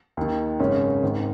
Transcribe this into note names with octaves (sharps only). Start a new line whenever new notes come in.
D#2 D#3
G#1 F#2 C#3 C#4
G#1 G#2 D#3